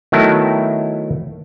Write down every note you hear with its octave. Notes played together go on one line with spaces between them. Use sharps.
D#3 F#3 A3 B3 E4